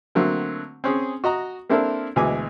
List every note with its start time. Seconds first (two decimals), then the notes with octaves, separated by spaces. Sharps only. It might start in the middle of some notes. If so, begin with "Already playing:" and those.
0.15 D3 F#3 A3 A#3 C4
0.84 C4 C#4 G#4
1.24 F#4 D#5 A#5
1.70 A#3 C4 D4 E4 A4 A#4
2.16 D2 B2 E3 G#3 G#5 D6